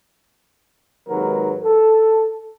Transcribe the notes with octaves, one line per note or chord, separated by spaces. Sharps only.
G#1 D#2 G#2 F#3 A#4 B4
A4